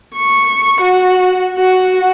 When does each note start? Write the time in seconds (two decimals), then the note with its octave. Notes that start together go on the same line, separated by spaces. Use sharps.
0.15 C#6
0.81 F#4
1.59 F#4